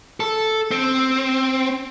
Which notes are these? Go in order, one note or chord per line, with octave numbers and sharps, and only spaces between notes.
A4
C4